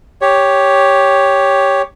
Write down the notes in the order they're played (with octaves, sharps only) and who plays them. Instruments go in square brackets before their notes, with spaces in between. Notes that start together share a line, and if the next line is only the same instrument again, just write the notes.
[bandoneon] G4 C#5